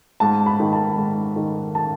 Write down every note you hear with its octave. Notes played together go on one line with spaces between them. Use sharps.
G#2 A5
B5
D#3
A5
G#2
D#3
A5